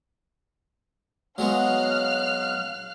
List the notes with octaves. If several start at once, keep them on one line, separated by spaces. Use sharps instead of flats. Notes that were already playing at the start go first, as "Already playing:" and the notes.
F#3 G#3 B3 F5 F6 F#6